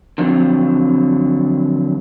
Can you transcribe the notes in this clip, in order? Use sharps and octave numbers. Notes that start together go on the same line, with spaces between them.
D3 F3 F#3 C4